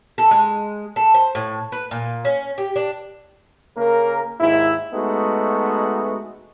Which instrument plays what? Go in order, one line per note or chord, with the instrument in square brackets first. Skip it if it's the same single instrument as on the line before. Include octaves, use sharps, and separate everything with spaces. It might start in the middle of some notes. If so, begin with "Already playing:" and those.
[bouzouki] A4
G#3
A4
C5
A2
B4
A#2
C#4
G4
D4
[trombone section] C#3 A#3 A#4
D#2 G#2 E4
G#3 A3 B3 D#4 F#4